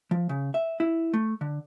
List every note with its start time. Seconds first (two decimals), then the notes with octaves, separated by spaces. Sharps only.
0.11 F3
0.29 C#3
0.54 E5
0.80 E4
1.13 A3
1.41 D3